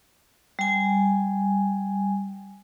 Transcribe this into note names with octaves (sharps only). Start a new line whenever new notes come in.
G3 G#5